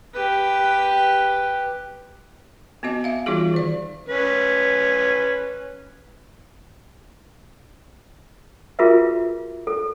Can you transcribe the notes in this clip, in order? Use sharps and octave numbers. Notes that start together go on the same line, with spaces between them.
G4 B4
B3 C4 F#4 D#5
E5 F5
E3 G3 D#4 F4 F#4 G#4
D#3 D5
C#4 B4
F4 F#4 G#4 A#4 B4 E5
A4